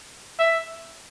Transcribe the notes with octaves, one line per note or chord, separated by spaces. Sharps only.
E5